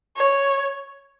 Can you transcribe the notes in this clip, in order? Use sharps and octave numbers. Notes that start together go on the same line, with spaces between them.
C#5